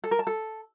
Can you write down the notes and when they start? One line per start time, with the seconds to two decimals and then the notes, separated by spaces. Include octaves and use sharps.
0.04 A4
0.11 A#4
0.19 A5
0.27 A4